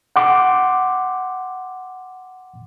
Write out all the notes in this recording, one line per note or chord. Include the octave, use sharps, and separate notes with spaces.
F#5 G5 C6 D6